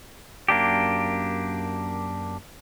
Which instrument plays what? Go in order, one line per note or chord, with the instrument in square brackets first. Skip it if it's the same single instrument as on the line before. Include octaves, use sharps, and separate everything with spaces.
[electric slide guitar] F#2 A#3 D4 G4